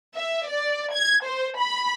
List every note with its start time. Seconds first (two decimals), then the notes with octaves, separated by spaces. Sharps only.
0.15 E5
0.47 D5
0.92 G#6
1.25 C5
1.57 B5